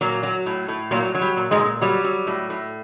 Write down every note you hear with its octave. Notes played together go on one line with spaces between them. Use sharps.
A#2 F#3 A#3
F#3
A2
A2
A#2 F#3 A#3
F#3
G3
A#2
G#2 G#3
A#2
F#3 G3
F#3
A2
A2